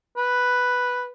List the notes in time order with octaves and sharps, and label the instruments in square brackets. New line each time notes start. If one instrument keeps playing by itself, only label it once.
[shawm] B4